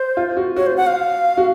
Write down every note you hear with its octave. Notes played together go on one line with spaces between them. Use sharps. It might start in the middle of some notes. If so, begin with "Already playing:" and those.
Already playing: C5
F4
F#4
F#4 C#5
C5
F#5
F5
F#4